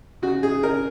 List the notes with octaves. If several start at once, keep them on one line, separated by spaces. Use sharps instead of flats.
C#3 F#4
C#3 G#4
C#3 A#4